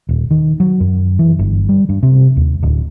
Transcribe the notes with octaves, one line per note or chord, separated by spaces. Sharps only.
D#1
D#3
F#3
F#2
E3
G1
G3
G2
C3
D#2
D1